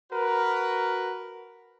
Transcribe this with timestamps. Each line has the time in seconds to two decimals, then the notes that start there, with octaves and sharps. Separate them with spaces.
0.13 F#4 A#4 B4